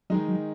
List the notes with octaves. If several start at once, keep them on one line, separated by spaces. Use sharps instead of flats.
D#3 F#3 G#3 D#4
F#3